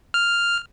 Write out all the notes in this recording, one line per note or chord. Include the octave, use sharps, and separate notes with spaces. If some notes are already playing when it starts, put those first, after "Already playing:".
F6